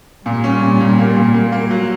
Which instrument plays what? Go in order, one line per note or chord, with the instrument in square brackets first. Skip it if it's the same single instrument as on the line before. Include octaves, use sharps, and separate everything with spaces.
[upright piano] A#2 [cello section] G3
[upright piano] C#4
A#2
A#2
A#3
A#2
A#3
A#3
F#3